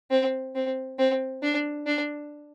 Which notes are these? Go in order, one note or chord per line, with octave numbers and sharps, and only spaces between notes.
C4
C4
C4
D4
D4